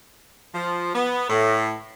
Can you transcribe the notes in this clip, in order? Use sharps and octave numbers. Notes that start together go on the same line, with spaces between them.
F3
B3
A2